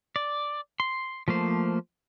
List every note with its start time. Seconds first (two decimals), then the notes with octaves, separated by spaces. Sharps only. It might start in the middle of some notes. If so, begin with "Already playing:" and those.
0.16 D5
0.80 C6
1.28 F3 A3 A#3 C5